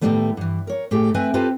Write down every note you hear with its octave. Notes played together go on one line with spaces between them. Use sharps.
A2 D#3 E3 G3 A3 B3
G2 E3
A#4 C#5
A2 A3 G4 G#4
A3 C4 B4 E5 G#5
C4 F4 G4 A4 B4 C5